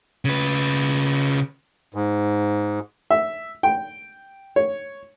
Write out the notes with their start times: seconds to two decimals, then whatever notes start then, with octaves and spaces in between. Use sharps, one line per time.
0.25 C#3 B4
1.94 G#2
3.11 E5
3.63 G5
4.56 C#5